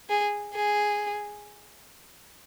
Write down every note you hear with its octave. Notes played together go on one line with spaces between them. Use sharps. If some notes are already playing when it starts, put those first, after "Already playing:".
G#4
G#4